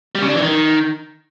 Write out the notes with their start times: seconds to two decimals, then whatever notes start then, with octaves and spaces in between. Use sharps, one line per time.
0.15 G3
0.22 C#3
0.29 D4
0.35 E3
0.42 D#3